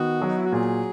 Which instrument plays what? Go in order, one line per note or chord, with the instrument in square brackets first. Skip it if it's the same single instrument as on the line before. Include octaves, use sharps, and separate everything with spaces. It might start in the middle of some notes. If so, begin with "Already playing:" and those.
Already playing: [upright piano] D#3 B3 [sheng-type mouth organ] F#4
[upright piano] F#3
[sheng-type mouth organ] D#4
E4
F#4
[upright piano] A#2 [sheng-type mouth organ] G#4